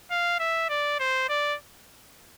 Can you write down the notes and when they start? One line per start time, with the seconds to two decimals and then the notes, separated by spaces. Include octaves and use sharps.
0.11 F5
0.39 E5
0.69 D5
0.99 C5
1.29 D5